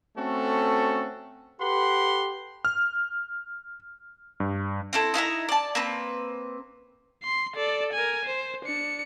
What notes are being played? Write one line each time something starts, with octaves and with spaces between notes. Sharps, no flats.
A3 C4 C#4 F#4 A4
G4 A4 B4 F#5 C6
F6
G2
C4 E4 A4
D#4 E4 E5 A#5
D5 A5
A#3 C4 B4
C6
A4 D5
A#4 G#5
C5
D4 C#7